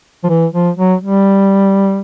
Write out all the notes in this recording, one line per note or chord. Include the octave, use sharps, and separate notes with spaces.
F3
E3
F3
F#3
G3